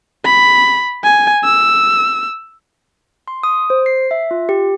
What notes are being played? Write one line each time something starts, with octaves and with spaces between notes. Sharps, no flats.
B5
G#5
E6
C6
D#6
C5
C7
E5
F4
G4